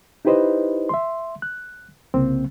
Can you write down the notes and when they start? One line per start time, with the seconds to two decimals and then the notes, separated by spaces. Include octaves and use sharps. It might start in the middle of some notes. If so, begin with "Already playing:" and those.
0.25 D#4 E4 G4 B4 C5 D#5
0.89 E5 C6
1.42 F#6
2.14 C2 C#3 A#3 C4